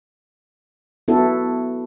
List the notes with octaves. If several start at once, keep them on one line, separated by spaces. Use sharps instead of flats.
B3 E4 F#4 A4